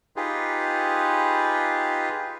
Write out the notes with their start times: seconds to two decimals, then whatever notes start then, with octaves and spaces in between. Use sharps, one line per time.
0.16 D#4 F4 G4 G#4 B4